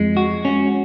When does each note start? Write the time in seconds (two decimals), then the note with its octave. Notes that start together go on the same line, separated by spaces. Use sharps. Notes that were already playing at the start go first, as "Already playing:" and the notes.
Already playing: F2 G#3
0.17 F#4
0.45 C#4